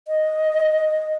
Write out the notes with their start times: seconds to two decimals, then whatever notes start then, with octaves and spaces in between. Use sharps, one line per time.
0.08 D#5